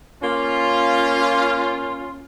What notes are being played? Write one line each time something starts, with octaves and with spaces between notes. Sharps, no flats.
A#3 C#4 F4